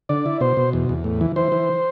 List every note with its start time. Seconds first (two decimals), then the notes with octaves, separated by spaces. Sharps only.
0.09 D3 D5
0.26 E4
0.41 B2 C5
0.57 B2
0.73 E2
0.89 E2
1.04 A2
1.21 E3
1.36 E3 C5
1.52 E3